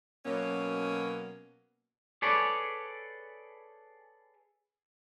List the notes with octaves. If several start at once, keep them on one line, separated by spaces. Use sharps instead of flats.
B2 F#3 A#3 C#4
G#4 A4 B4 C#5 D5